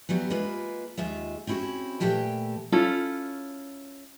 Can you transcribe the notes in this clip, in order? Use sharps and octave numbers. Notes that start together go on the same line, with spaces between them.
E3 F#3 G3 B3
G#3 A#3 E4 F4 B4
D#2 G#3 F4 E5
C4 C#4 E4 F#4 G#4
A#2 E3 A3 G4 G5 A5
C#4 E4 F4 A4